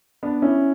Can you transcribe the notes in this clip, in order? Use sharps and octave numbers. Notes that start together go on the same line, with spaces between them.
B3 D4
C#4 E4